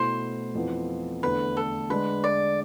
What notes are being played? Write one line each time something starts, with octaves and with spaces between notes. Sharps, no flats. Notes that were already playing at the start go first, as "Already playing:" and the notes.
Already playing: B2 A3 E4 C5
F2 E3 B3 F4
E2 D3 A3 E4 B4
A4
D3 G#3 D4 B4
D5